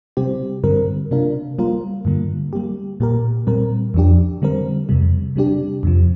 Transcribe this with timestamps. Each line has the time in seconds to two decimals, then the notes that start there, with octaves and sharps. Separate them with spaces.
0.17 C3 G3 C4 G4
0.64 G2 D3 G3 C4 A#4
1.11 C3 A#3 D4 F4 A#4
1.59 G3 A#3 F4 A#4
2.05 G2 D3 G3 A#3
2.53 G3 A#3 G4
3.00 A#2 A#3 G4 A#4
3.47 A#2 G3 C4 A#4
3.94 F2 F3 D4 G4
4.42 D3 G3 C4 A#4
4.89 F2 C3 G3
5.36 C3 G3 D4 G4
5.83 F2 C3 F3